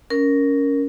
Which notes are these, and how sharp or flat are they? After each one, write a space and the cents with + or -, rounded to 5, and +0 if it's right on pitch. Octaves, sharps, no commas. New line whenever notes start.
C#4 +15 A#4 +0